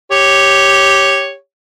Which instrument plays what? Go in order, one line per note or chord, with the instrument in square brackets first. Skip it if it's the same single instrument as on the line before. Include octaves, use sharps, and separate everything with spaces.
[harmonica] G4 C#5